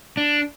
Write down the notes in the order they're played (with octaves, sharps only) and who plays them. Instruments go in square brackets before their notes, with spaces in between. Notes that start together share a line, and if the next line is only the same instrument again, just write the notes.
[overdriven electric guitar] D4